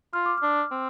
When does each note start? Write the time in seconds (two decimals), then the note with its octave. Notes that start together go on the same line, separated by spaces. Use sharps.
0.13 F4 F6
0.26 D6
0.38 D4 F6
0.72 C4